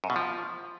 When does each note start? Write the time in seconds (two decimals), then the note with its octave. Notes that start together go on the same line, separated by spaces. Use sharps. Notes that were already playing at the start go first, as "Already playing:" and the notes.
0.04 F#2
0.10 B2
0.16 F3